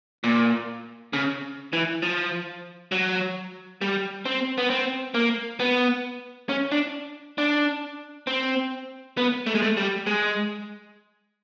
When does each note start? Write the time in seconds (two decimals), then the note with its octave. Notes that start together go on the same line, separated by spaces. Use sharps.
0.24 A#2
1.13 C#3
1.73 E3
2.02 F3
2.92 F#3
3.81 G3
4.25 C4
4.58 B3
4.70 C4
5.14 A#3
5.60 B3
6.49 C#4
6.72 D4
7.38 D4
8.27 C4
9.17 B3
9.46 A3
9.55 G#3
9.62 A3
9.77 G3
10.07 G#3